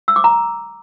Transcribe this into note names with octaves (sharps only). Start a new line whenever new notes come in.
E6
D6
A#5